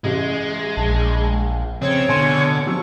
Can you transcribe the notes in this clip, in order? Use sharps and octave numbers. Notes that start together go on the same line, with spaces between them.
A1 G#3
A#1 A5
F2 C#3 C4 C#5
B2 D3 G#5 C6
F3 F#3 C#6 E6